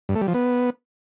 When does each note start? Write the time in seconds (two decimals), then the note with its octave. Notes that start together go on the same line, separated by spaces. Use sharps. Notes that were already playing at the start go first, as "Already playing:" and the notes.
0.09 G2
0.15 A3
0.22 G3
0.28 F3
0.34 B3